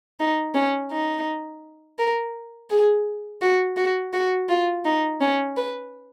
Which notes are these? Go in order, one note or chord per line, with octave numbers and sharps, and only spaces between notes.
D#4
C#4
D#4
A#4
G#4
F#4
F#4
F#4
F4
D#4
C#4
B4